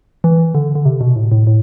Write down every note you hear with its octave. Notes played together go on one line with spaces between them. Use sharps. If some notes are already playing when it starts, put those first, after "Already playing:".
E3
D3
D3
C3
B2
A2
A2
A2